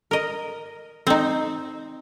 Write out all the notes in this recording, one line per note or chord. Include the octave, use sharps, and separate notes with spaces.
A#4 D#5
C4 D#4